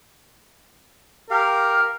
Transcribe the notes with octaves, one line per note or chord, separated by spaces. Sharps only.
G4 A#4 F5